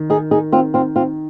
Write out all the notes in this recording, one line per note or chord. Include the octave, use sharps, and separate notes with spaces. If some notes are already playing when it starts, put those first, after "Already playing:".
Already playing: D#3
D#4 G#4
D#4 G#4
C4 F4
C4 F4
C4 F4